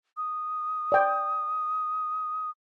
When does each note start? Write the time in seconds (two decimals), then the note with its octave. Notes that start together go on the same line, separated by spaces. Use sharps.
0.17 D#6
0.92 D5 G5